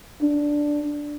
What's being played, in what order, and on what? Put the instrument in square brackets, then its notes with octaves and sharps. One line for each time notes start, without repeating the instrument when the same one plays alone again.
[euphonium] D4